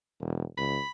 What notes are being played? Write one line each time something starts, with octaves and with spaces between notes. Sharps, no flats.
E1
C#2 B5